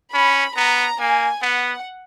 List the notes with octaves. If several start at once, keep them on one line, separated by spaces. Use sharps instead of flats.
C#4 B5
B3 A#5
A#3 G#5
B3 F#5